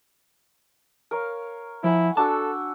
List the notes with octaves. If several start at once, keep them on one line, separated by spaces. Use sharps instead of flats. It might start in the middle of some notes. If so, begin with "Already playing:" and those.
A#4 C#5 F5
F3 E4 F#5 G#5 B5
D4 F#4 A4 A5 E6